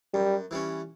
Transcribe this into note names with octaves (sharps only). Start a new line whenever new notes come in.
F#2 G3
E3 G3 C#4